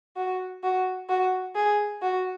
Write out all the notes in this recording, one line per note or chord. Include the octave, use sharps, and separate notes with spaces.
F#4
F#4
F#4
G#4
F#4